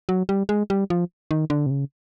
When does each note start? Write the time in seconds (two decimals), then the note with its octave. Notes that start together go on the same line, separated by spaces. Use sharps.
0.09 F#3
0.29 G3
0.49 G#3
0.70 G3
0.90 F3
1.31 D#3
1.50 D3
1.66 C3
1.70 C#3